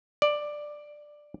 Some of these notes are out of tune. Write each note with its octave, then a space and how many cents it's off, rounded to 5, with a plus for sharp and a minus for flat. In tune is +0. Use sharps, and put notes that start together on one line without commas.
D5 +10